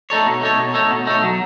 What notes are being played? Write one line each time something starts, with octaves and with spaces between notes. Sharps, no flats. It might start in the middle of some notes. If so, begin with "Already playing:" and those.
A3 D#4 A4 C#5
B2
A3 D#4 A4 C#5
B2
A3 D#4 A4 C#5
B2
A3 D#4 A4 C#5
F#3